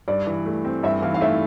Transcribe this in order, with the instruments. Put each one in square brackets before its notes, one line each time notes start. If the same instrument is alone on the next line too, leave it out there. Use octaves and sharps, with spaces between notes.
[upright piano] G2 [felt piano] D5
[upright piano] E3
A3
C4
[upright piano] G2 [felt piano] E5
[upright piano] E3 [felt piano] F5
[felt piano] F5
[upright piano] A3 [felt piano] E5